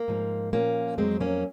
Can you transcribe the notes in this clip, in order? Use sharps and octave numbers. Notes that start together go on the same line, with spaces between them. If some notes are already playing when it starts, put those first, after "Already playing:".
Already playing: A#3
G#2 F3
A#2 F3 A#3 C#4
F2 D#3 F#3 G#3 C4
A#3 C#4